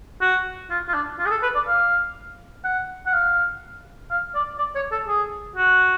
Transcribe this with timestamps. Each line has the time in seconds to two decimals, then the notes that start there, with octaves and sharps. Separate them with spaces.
0.21 F#4
0.71 F4
0.89 F4
0.94 D4
1.19 F4
1.26 G#4
1.31 A4
1.43 B4
1.55 D5
1.67 F5
2.64 F#5
3.06 F#5
3.13 F5
4.11 F5
4.35 D5
4.59 D5
4.75 C#5
4.91 A4
5.07 G#4
5.56 F#4